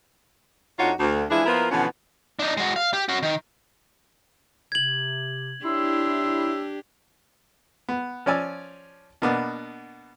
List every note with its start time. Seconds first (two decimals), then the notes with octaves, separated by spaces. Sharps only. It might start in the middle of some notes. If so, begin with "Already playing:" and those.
0.79 F2 D4 D#4 F4 F#4 C#5
1.00 D2
1.30 E3 F3 G#3 D4 E4 G#4
1.46 F3 A#3 B3 E4 F4 A#4
1.71 B2 D3 E3 F3 B3 C#4
2.39 D4 D#4
2.57 G#3 F#4
2.76 F5
2.93 G4
3.09 C#4 F#4
3.23 D#3
4.72 C3 G#6 F#7
5.64 D4 E4 G4 C#5 C6 E6
7.89 B3
8.26 F3 C#4 D5 G#5 E6
9.22 B2 A#3 B3 D4